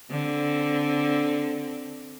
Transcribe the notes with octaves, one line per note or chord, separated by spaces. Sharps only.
D3 C4